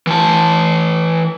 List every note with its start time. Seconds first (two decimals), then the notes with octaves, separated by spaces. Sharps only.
0.07 E3 A5